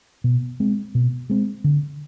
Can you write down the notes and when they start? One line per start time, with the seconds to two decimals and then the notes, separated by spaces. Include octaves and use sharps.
0.24 B2
0.60 G#3 C4
0.95 B2
1.30 G#3 C4
1.64 D3